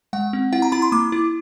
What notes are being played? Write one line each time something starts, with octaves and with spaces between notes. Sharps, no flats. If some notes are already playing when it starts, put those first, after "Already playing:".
G#3 F#5
C4
E4 F#5
A#5
E4 B5
C6
A#3 D6
E4